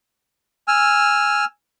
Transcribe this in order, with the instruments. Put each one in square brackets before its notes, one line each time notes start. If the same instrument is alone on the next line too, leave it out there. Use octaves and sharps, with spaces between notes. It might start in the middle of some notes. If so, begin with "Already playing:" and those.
[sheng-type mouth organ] G#5 E6 F6